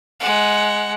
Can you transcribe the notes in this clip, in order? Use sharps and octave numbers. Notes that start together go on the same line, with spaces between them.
G#3 F#5